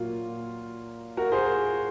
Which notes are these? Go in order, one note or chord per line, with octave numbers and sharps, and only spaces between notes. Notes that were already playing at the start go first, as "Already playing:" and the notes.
Already playing: A#2 F#3 A#3 F4
F#4 A#4
G#4 C5